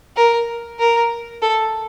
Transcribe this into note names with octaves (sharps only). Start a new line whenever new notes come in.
A#4
A#4
A4